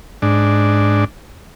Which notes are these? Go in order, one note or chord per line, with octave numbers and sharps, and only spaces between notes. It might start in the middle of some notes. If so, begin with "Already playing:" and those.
G#2 D4